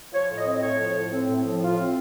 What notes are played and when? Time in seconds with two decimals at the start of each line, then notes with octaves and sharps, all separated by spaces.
0.13 F3 C#5
0.29 A2
0.37 D#5
0.46 C4
0.53 D#5
0.62 A2 C#5
0.79 F3
0.96 A2
1.12 C4
1.28 A2
1.45 F3
1.62 A2 F4
1.78 C4